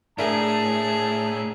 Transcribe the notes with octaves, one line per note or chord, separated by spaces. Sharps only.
A2 D4 G#4 A#4 E5 A5